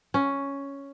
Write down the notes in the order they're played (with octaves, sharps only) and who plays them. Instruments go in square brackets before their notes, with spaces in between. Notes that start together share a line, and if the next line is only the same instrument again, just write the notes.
[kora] C#4